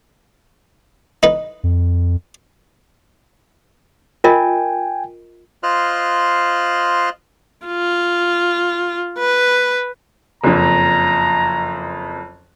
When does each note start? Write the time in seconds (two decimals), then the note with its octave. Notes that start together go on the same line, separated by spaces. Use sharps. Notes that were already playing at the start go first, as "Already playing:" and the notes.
1.23 D#4 B4
1.63 F2
4.24 F4 A#4 D#5 G5 G#5
5.63 F4 C5 D#5 C6 F6 F#6
7.66 F4
9.18 B4
10.44 F#1 F2 A#5